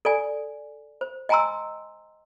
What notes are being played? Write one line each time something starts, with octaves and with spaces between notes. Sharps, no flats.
A4 D5 G#5
C5
D#5 G5 G#5 A#5 C6 E6